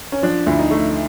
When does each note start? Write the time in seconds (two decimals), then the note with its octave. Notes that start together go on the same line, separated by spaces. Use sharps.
0.12 C#4
0.22 F3 D4
0.47 D2 E4
0.59 D#4
0.71 A3